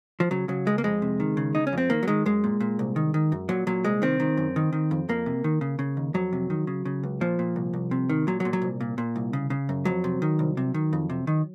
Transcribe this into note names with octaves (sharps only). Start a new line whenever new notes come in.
F3
C#3 F#3
C#3 F#3
C#2 G#3
A#3
F2 G#3
C3
D#3
C#3
C#3 D#4
C#4
F2 C4
D#3 A#3
F#3
D#3 G#3
F#2 G#3
A#2
A#2
C2
D#3
D#3
F#2
A#2 F#3
A#2 F#3
C2 G#3
D#3 C4
D#3
F#2
D#3
D#3
F2
F2 A#3
C3
D#3
C#3
C#3
D#2
F2 F#3
C3
D#3
C#3
C#3
C#2
A#2 F3
A#2
C2
C2
C3
D#3
A#2 F#3
F#3
A#2
F#3
C2
A#2
A#2
C2
C#3
C#3
F#2
F2 F#3
C3
D#3
C2
C3
D#3
F2
C3
D#3